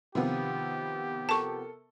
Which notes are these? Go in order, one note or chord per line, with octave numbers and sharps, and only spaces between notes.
C3 D#3 F3 B3 F4 G4
A4 A#4 A5 C#6